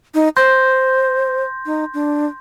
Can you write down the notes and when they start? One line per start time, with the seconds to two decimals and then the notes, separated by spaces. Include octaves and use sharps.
0.15 D#4
0.37 C5 C6 G6 A#6
1.66 D#4
1.94 D4